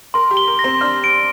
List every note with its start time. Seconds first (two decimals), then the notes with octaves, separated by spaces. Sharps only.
0.14 A#4 C6
0.31 G4
0.37 G7
0.48 A#4
0.59 A#6
0.64 C4 C5
0.81 D4 D5 F6
1.04 D7